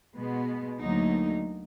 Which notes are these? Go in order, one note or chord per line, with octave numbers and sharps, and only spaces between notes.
B2 G#3 B3
D2 D3 F#3 A#3 D#4